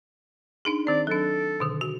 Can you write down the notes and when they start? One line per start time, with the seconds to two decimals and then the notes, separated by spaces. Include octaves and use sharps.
0.65 D4 D#4 G#4
0.87 D#3 C4 D5
1.07 F#3 D4 A4
1.60 B2 D3 D#3
1.81 F#4